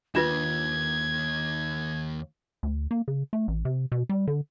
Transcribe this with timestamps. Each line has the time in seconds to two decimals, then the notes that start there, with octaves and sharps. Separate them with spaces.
0.15 D#2 D4 F4 B4 G#6
2.63 D2
2.91 A#3
3.08 C#3
3.33 A3
3.48 A1
3.65 C3
3.92 B2
4.09 G3
4.27 D3